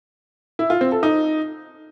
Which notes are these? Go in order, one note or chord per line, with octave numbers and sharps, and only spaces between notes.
E4
F4
C4
A4
D#4